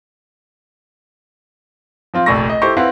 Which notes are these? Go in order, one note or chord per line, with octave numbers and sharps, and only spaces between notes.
F3 C4 F4
F1 A#1 A4 C#6 A#6
D#5
E4 G4 A4 C5 C#6
C4 E4 B4 F5 F#5